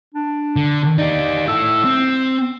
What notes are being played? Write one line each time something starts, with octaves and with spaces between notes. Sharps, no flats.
D4
D3
D#4 G4 D5
E4 A4 E6
C4